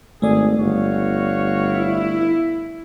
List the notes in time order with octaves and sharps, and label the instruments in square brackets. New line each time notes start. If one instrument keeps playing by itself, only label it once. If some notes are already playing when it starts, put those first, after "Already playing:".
[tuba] G#1 [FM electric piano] A3 D5 [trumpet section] G#4
[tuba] G1 [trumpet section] F#4 C#5 F5
[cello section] E4